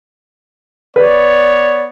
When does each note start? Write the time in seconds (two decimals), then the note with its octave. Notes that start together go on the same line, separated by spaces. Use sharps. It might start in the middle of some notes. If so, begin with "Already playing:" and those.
0.96 B3 B4 C#5 D5